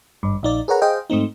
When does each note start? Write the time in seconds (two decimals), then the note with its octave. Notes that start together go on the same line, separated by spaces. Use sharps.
0.23 G#1 G2
0.43 A#1 D#4 D5
0.68 G#4 A#4 B4 C#5 F#5 A#5
0.82 G#4 C5 D#5 F5 G5
1.10 G#2 A3 C4 D#4